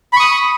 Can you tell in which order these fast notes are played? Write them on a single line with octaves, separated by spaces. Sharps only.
B5 C#6 D#6